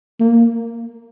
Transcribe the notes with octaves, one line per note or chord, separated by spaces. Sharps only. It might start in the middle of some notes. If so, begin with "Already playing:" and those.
A#3